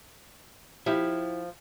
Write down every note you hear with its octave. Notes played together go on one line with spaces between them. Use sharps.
F3 E4 G4 E5